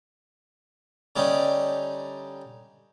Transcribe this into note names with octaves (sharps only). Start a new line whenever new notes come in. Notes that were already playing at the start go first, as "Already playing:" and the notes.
D3 G3 C#4 D#4